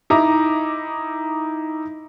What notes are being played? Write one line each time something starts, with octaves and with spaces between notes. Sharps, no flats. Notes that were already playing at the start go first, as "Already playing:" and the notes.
D#4 E4 A#5 D6